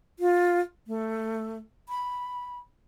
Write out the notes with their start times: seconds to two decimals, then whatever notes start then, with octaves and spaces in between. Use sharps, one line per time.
0.19 F4
0.87 A3
1.89 B5